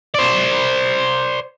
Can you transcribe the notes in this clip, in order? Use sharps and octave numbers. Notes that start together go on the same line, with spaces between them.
C5 D5